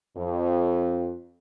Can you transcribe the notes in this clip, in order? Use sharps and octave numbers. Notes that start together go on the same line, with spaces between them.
F2